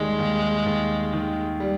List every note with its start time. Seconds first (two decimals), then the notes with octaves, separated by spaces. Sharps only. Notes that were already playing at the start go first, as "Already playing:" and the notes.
Already playing: D#2 D#3 G3 G#3
0.19 D#2
0.66 D#2
1.13 D#3
1.60 G3